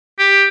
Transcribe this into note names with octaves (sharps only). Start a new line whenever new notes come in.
G4